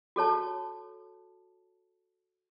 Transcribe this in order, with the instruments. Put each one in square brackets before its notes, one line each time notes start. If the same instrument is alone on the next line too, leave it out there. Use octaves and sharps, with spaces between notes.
[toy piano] F#4 A4 C#5 A5